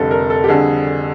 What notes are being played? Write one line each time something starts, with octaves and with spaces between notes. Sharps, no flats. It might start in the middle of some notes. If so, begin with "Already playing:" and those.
Already playing: F1 F2 D3 G3 A4
A#4
A4
G4
F2 D3 G3 G#4